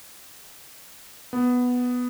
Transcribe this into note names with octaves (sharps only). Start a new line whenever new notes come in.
B3